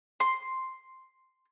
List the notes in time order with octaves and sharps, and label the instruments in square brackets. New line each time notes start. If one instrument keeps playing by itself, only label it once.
[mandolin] C6